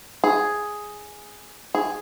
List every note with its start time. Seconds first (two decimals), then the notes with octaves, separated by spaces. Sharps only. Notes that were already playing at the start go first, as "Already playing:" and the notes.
0.24 G#4
1.74 G#4